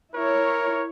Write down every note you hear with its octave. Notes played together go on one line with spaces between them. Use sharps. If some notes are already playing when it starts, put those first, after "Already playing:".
E4 A#4 C#5